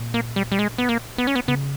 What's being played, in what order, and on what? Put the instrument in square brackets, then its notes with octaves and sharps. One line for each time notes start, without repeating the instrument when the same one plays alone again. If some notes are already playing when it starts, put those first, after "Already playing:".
Already playing: [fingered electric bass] A#2
[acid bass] A#3
G3
G3
G#3
B3
A#3
B3
C#4
B3
[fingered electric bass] C#3 [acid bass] B3